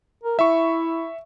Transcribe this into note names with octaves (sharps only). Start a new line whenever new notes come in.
A#4
E4 E5 C#6